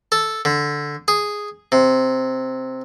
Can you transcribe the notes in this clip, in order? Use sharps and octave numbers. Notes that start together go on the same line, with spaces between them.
A4
D3
G#4
C3